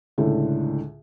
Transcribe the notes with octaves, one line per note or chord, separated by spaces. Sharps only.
C#2 A2 D3